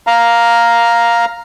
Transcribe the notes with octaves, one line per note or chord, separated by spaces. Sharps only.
F5 A#5